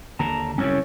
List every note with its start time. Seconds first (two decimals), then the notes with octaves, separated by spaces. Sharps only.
0.19 D#2 D3 A5 A#5
0.58 C2 F#2 C#3 C#4 C#5